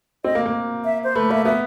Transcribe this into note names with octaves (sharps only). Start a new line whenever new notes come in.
C4 D#5
A#3
A#3
E5
C5
A3 B4
A#3 E5
B3 E5